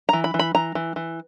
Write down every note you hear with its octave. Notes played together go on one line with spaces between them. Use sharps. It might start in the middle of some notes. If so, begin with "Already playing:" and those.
E3 A#5
B5
E3
B5
E3 A#5
E3
E3